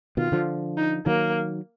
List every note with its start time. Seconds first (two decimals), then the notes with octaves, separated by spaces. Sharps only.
0.17 B2 D#3 F4
0.32 D3 F3
0.77 D#4
1.06 D#3 F#3 A#3